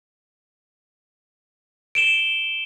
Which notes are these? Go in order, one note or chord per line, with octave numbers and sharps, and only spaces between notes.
D7 E7 G7